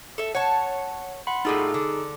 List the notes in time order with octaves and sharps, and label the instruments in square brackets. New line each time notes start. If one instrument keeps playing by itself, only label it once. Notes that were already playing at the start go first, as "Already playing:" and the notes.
[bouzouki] A4 E5
[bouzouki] C#5 A5 [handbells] F#5
[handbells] F#5 B5 C6
[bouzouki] A2 G3 F4 [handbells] D#4 G#4 A4
[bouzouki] D3